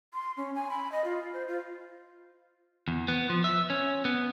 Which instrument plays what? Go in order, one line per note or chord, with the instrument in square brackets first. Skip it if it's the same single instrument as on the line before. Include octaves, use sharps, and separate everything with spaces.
[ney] C6
C#4
G#5
B5
D#5
F4
C5
F4
[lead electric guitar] E2
B3
F3
E5
C#4
B3